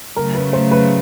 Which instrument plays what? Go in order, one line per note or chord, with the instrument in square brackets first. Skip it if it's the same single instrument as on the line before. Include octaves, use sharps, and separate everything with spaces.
[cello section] C#3 F#3 A3 [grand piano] A#4
[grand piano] B4
C5
B4